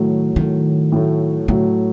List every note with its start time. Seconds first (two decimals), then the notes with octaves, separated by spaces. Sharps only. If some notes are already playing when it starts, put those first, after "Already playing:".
Already playing: A2 D#3 F#3 A3
0.36 A2 D#3 F#3 A3
0.92 A2 F#3 A3
1.48 A2 D3 F#3 A3